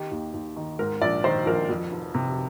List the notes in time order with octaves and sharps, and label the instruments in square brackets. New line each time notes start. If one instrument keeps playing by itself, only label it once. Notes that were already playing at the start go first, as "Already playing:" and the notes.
Already playing: [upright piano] D#3 G4
D#2
D#2
D#3
G#2 A#4
A#1 D5
D#3 C5
A#1 A#4
F2
F1
C3